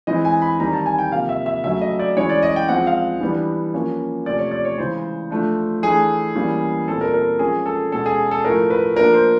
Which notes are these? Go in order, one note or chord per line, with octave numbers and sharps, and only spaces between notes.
E3 G#3 C4 D#5
G#5
B5
D#3 G3 C4 A#5
A5
G#5
G5
C3 F3 A#3 F5
E5
E5
C#3 F#3 A3 C#4 E5
D#5
D5
E3 G#3 C#4 C#5
D5
D#5
G5
F3 G#3 C4 F#5
F5
E3 G3 B3 D4
F3 A#3 C#4
C3 F3 A3 D5
C#5
D5
C#5
C#3 E3 G#3 C5
F3 A3 D4
E3 A3 D4 G#4
E3 G3 A#3 C#4
A#2 G3 C4 A4
A#4
A#4
F3 G#3 C#4 G#4
A4
B2 G#3 C#4 A4
G#4
A4
A2 F3 A3 A#4
B4
F3 A#3 D4 A#4
C5